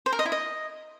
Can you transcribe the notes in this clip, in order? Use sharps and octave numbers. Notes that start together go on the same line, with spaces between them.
C5
A#4
D#5
E4
D#5